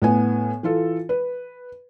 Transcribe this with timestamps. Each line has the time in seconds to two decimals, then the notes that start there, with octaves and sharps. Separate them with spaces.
0.02 A2 B3 G#5
0.63 E3 F4 A4
1.09 B4